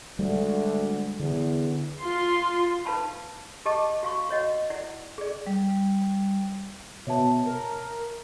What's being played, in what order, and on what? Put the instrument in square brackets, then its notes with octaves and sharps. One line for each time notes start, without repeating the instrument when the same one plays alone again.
[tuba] D2 [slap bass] G3 G#3
[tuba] E2 [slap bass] D3
[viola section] F4 C6
[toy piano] D#4 B4 F5 A5 B5
G4 D#5 A5 D6
F#4 F5 C#6
F#4 C#5 D#5 F#5
E4 D5 F#5
G#4 D5
[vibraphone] G3
[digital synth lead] B2 [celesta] C#5 E5 A5
[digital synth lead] A#4